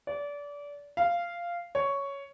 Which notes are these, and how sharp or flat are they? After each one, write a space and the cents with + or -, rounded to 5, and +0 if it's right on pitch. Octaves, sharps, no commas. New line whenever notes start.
D5 -25
F5 -10
C#5 +5